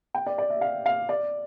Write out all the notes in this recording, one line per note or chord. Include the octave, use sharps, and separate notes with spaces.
G5
D5
D5
E5
F5
F5
D5